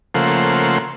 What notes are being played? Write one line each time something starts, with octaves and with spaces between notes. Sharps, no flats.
C#3 F3 A3 A#3 C5 F#5